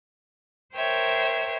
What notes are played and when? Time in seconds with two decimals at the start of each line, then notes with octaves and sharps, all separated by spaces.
0.74 A#4 C5 C#5 E5 G5